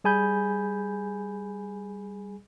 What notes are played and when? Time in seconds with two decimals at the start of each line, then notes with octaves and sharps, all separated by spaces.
0.04 G3 G#4 G#5 B5 G6